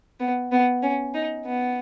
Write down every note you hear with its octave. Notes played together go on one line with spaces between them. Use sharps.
B3
B3
C#4
D#4
B3